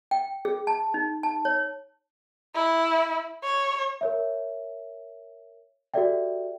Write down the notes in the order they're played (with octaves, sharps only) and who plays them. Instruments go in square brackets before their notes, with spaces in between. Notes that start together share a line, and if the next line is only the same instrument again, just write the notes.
[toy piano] G5
G#4
A5
D#4
A5
C#5
[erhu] E4
C#5
[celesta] A#4 C#5 E5
F#4 G4 A4 D5 E5 G5